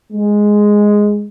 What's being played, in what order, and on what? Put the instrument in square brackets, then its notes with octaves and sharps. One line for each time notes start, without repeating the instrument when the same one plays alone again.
[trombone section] G#3